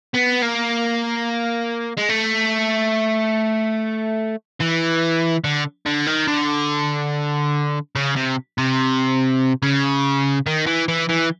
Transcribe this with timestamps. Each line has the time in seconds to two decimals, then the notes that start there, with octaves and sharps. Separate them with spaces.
0.14 B3
0.42 A#3
1.97 G#3
2.09 A3
4.61 E3
5.44 D3
5.86 D3
6.07 D#3
6.28 D3
7.95 C#3
8.16 C3
8.58 C3
9.62 C#3
10.46 D#3
10.67 E3
10.88 E3
11.09 E3